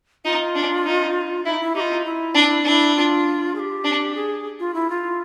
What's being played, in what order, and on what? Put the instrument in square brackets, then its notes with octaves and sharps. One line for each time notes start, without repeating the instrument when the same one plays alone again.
[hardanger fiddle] D#4 [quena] F4
[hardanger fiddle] D4
D#4
[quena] D#4 [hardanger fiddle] E4
[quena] E4
[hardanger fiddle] D#4 [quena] F4 G4
[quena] E4
[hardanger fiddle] D4
[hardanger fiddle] D4 [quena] E4
[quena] F4
G#4
G4
[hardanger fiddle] D4
[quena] G#4
F4
E4
F4